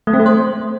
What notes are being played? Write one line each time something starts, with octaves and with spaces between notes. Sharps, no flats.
A3
C4
A3
C5